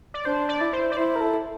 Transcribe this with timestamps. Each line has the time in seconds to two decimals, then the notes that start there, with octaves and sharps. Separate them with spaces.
0.14 D5
0.25 D4 C5
0.49 D5
0.61 E4
0.73 C5
0.92 D5
0.97 E4 C5
1.16 A#4
1.21 A4